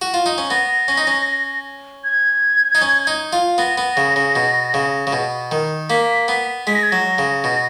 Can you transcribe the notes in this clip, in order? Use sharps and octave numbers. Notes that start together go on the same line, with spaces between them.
F#4
F4
D#4
C#4
B3 A#6
C#4
D#4
C#4
G#6
D#4
C#4
D#4
F4
B3 A#6
B3
C#3
C#3
B2
C#3
C#3
B2
D#3
A#3 B6
B3
G#3 B6
A#6
G#6
F#3 A#6
C#3
B2